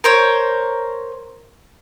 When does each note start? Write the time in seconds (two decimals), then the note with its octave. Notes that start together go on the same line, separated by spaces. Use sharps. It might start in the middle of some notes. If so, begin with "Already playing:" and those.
0.04 A#4 C5 C#5